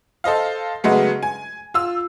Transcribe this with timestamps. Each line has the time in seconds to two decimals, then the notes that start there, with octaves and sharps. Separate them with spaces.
0.24 A4 C5 D#5 F5
0.84 C#3 F#3 G#3 A3 B3
1.23 G#5
1.74 F4 E6